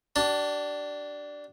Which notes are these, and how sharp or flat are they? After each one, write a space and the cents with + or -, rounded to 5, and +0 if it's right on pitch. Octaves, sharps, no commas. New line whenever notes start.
D4 +0 G4 -35